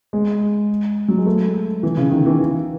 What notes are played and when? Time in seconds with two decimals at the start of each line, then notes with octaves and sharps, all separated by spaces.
0.13 G#3
1.08 F#3
1.18 G#3
1.26 A3
1.83 E3
1.97 C#3
2.11 D#3
2.26 E3